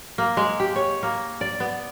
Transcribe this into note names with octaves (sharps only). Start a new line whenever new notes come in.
A#3
G#3
G4
C#5
A#3
D5
B3